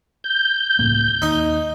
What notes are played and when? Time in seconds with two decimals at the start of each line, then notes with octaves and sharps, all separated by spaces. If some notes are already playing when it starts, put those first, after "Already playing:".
0.24 G6
0.79 C#2 A2 A#3
1.22 D#2 D#4